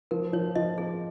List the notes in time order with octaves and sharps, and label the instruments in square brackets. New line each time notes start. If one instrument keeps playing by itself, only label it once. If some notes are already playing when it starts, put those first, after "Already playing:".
[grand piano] F3 [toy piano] A#4
[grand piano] F3 [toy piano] C#5
[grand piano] F3 [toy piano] D#5
[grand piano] C4 [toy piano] G#4